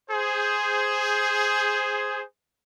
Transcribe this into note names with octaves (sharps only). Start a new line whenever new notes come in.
G#4 C5